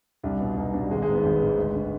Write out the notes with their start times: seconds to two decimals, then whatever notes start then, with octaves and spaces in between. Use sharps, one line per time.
0.23 C2 D4
0.40 B2
0.57 C2 D#4
0.73 B2 D4
0.82 G3
0.91 G#1 G#3
1.02 G#3
1.08 G#2 D#3 B3
1.24 G#1
1.41 G#2 D#3
1.58 D2
1.75 D3